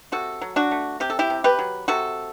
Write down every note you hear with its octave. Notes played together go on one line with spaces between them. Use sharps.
C3 F#4 A4
F#3
D4 F#4
A3
C3 G4
A4
E4 G4
C3
G4 B4
F#3
C3 F#4 A4